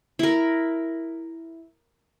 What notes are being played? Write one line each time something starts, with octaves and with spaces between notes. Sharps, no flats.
E4 A#4